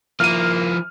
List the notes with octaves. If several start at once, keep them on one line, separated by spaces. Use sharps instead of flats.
F3 A#3 E4 F6 D#7